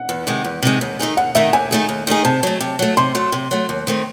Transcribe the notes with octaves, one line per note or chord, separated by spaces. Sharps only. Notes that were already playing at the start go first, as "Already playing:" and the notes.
Already playing: F#5
E2
C3 D#3 G#3
E2
C3 D#3 G#3
D#2
D#3 A3 D#4 G#4
D#2 F#5
D#3 A3 D#4 G#4 E5
D#2 G#5
D#3 A3 D#4 G#4
D#2
D#3 A3 D#4 G#4
C3 A5
F#3 A3
C3
F#3 A3
C3 C6
F#3 A3
C3
F#3 A3
D#2
D#3 A3 C4